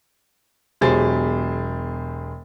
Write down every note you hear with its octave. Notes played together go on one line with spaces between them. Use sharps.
E1 F#3 G4 G#4 C5 A6